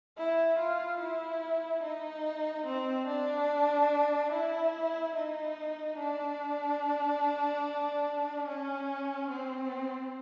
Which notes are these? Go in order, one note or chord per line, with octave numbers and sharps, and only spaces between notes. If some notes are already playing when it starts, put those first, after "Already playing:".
E4
F4
E4
D#4
C4
D4
E4
D#4
D4
C#4
C4